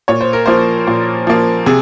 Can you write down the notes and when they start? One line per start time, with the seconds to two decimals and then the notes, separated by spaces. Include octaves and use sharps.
0.08 A#2 C#5
0.21 C5
0.33 A#4
0.46 F3 A#3 C5
0.87 A#2
1.27 F3 A#3
1.66 C3 G#4